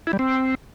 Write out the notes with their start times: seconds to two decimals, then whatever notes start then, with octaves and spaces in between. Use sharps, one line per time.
0.07 E4
0.13 G3
0.19 C4